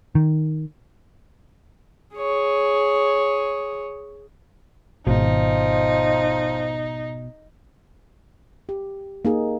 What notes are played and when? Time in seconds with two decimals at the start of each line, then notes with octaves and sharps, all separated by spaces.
0.15 D#3
2.16 G#4 C#5
5.07 G#1 B2 F3 D#4
8.69 G4
9.25 A#3 D#4 G#4